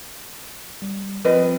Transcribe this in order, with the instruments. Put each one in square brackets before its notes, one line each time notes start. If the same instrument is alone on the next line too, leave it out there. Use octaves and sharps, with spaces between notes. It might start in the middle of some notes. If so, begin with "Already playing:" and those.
[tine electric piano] G3
[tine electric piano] F3 C4 [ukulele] B4 D#5